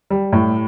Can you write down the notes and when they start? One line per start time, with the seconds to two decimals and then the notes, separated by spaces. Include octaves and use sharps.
0.10 G3
0.33 A2